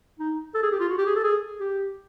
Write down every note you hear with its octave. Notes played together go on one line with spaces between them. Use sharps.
D#4
A4
G#4
G4
F4
F#4
G4
G#4
A4
G#4
G4